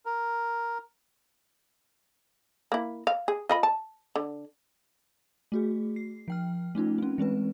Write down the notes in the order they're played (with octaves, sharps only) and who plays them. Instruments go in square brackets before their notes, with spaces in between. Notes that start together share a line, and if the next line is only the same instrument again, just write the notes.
[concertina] A#4
[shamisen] A#3 E4
F5
G#4
F4 D#5 B5
A5
D3
[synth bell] A3 F#4 G#4
C7
F3 G5 F6
A3 C#4 D#4 F4
C4 C#4
E3 G#3 C4 B4